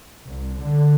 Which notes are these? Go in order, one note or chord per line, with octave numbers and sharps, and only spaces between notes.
C2
D3